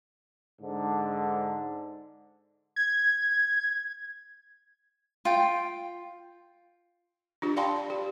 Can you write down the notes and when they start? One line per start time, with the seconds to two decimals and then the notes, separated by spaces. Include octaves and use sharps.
0.61 G#2 D3
2.76 G#6
5.25 F4 G5
7.42 D4 F4 G4
7.57 D5 F5 G5 A5 B5 C6
7.76 D5
7.90 G4